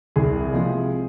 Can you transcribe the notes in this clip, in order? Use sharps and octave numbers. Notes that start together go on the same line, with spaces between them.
C2 G#4
C3 F3 G#3